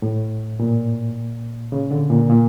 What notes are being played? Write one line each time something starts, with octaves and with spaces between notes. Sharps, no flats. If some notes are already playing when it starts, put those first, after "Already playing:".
A2
A#2
C#3
D3
A#2
A#2